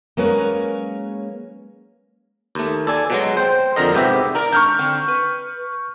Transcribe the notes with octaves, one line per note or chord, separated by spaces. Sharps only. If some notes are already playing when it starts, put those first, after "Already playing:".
F#3 G#3 A#3 C#4 B4 C#5
D#2 A3
A4 D5 G#5
B2 F#3 G#3
C5 G5
F2 D3 A#4 D#5
G#2 C3 B3 G4 E5
A#4 D5 A#5
G#3 D4 C#6 F6 G6
D3 C4
B4